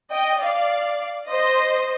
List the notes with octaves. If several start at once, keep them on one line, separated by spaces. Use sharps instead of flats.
D#5 G5
D5 F5
C5 D#5